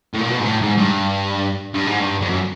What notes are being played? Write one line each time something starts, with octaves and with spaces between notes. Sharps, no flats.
A2
A#2
B2
G#2
A2
G#2
G2
G2
G#2
G2
F2
F#2